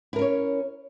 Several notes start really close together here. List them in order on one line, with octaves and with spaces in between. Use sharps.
E4 A#4 C#4 C#5